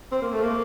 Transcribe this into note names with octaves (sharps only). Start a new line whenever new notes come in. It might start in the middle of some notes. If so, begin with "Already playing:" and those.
C4
A#3
A3
A#3